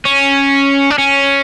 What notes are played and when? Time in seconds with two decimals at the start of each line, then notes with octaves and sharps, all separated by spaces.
0.05 C#4
0.90 D4
0.98 C#4